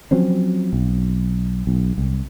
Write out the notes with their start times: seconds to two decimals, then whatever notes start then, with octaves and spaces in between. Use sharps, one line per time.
0.11 F3 F#3 C4 C#4
0.73 B1
1.67 B1
1.98 C2